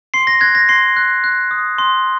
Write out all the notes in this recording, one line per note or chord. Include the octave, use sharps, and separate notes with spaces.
C6 C7
A#6
F#6 G#6
A#6
C6 C7
F#6
F#6
D#6
C6